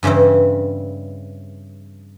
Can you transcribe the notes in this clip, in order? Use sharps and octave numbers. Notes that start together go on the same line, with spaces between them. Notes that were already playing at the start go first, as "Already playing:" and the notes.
G2 C#3 E3 G3 C4